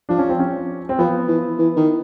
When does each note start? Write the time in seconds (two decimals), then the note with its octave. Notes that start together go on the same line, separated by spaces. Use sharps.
0.09 F3 D4
0.19 C#4
0.29 C4
0.40 C#4
0.89 C4
0.99 F3 B3
1.28 E3
1.58 E3
1.76 D#3